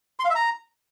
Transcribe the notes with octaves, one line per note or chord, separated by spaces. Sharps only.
C6
F5
E5
A#5